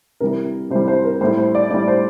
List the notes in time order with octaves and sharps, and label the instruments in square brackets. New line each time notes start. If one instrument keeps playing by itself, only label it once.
[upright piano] C3 E3 G3 A#4
C3 E3 G3 C5
C5
A#4
G3 C5
A2
C5
D5
A2 G3 D5
C5